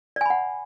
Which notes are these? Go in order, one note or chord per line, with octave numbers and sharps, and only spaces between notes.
D5 F#5 G#5 B5